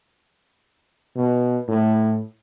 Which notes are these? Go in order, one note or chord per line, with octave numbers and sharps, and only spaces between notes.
B2
A2